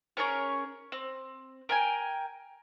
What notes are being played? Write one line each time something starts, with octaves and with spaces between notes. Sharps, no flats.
C#4 G#4 A#4 C#5
C4
A#4 G5 G#5